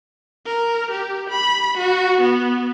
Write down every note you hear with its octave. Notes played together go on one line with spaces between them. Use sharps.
A#4
G4
B5
F#4
B3